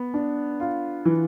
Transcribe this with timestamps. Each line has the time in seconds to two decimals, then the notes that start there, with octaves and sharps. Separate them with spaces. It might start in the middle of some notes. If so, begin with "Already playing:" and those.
Already playing: B3
0.14 D4
0.60 F4
1.05 E3